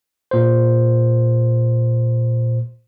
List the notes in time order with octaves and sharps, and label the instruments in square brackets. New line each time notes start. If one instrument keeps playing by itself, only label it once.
[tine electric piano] A#2 C5